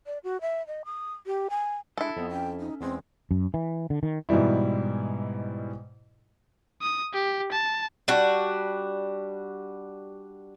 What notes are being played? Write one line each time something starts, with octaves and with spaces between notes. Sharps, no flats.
D5
F#4
E5
D#5
D#6
G4
G#5
G#3 D4 E4 A4
F2 B3
C#4 G5
D#4
E2 G#3 C4
F#2
E3
D3
D#3
G#2 B2 E3 G3 E4
D#6
G4
A5
G3 D4 F#4